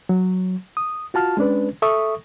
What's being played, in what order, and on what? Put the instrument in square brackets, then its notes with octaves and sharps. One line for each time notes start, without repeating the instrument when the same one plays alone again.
[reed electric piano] F#3
D#6
F4 F#4 A5 F6
G#3 C#4 D4 B4
A4 E5 C#6 D#6